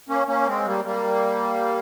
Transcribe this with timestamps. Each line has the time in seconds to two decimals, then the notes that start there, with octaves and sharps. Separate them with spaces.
0.08 A#3 C#4
0.27 A#3 C#4
0.46 G#3 C4
0.66 G3 A#3
0.85 G3 A#3